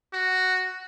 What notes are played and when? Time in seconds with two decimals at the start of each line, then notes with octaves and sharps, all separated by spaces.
0.13 F#4